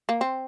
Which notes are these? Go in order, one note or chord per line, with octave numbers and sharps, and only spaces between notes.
A#3
C4